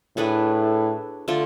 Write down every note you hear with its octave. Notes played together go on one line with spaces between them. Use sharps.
A2 A3 D4 G#4 B4
D3 A3 D4 F4